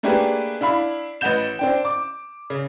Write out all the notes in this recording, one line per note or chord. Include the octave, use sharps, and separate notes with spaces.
A3 A#3 D4 G4 G#4 B4
D4 E4 F5 B5
A1 B4 D#5 F#5 G6 E7
C4 D4 G5
D6
C#3